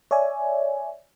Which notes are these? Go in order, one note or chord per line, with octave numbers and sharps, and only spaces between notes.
C#5 D5 E5 G#5